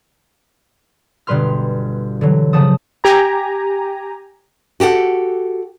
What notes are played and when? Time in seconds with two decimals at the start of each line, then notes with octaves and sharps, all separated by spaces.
1.27 G1 B2 G3 B4 C6 F6
2.21 D3 E3 F#3
2.53 C#3 F3 F#5 A5 D#6
3.04 G4 G#5 A#5
4.80 F#4 G4 A4 F#5